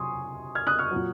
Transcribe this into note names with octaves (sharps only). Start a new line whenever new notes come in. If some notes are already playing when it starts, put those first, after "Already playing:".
Already playing: C3 F#3 G#5 C6 C#6 D#6
F6 G#6
D#6 F#6
C#6 F6
A#2 F#3